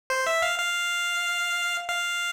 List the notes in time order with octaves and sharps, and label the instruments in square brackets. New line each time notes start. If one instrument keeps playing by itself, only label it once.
[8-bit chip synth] C5
E5
F5
F5
F5